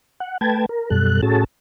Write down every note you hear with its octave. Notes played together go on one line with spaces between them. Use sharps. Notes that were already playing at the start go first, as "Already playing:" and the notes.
F#5
A3 B4 G5 A5 G#6
A#4
F#2 B2 G3 A4 F#6
A2 C#4 F#4 G#4 A4 A5